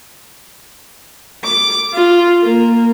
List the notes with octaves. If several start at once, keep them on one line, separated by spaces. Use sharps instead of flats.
D6
F4
A#3